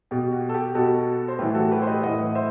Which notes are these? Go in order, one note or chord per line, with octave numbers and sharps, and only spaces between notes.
B2 G4
F#4
A4
G4
B2 F#4 A4
C5
A2 E3 G4 B4
F#4 A4
G4 B4
C5
B4 D#5
A2 E3 D#5 F#5
C5 E5